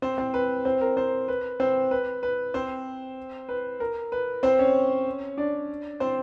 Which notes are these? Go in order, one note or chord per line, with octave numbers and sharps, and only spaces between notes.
C4 C5
C4 C5
B4
C4 C5
A#4
C4 C5
B4
C4 C5
B4
B4
C4 C5
B4
A#4
B4
C4 C5
C#4 C#5
D4 D5
C4 C5